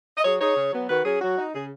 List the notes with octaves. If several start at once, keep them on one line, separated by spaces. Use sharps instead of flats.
D#5
F#3 G#4 C#5
D#4 G#4 C#5
C#3
F#3 B3
D#3 F#4 B4
F#3 C#4 G#4
F#3 F#4
D#4
C#3 G#4